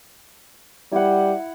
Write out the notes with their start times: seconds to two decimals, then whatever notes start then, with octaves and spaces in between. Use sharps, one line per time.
0.92 G3 E4 F#5